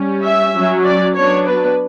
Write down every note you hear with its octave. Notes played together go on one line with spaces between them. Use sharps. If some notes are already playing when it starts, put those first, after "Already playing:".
Already playing: G3 C#4
E5
F#3 C#4
D5
F#3 B3 D4 C#5
B4